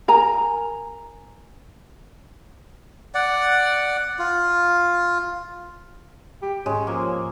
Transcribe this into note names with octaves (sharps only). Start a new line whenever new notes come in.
A#4 G#5 A#5
D5 F#5
F4
G4
G#2 G#3 C#4
F3 A#3